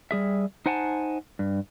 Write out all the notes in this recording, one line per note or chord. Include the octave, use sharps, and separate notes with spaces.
G3 G#4 E5
D#4 C5 F#5 G#5 A5
G2